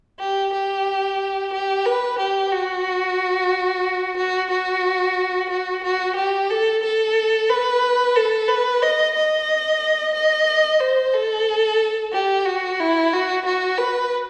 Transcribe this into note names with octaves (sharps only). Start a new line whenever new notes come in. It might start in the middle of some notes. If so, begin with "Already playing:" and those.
G4
G4
G4
B4
G4
F#4
F#4
F#4
F#4
F#4
G4
A4
A4
B4
A4
B4
D#5
D#5
D#5
C5
A4
G4
F#4
E4
F#4
F#4
B4